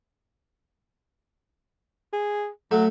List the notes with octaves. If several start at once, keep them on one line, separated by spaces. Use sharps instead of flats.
G#4
F#3 A3